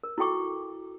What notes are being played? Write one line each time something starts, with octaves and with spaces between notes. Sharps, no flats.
A#4
E4 F#4 A4 G5 C#6 D6